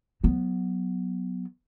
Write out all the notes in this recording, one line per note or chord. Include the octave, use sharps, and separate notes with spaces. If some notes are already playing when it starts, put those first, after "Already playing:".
F#3 B3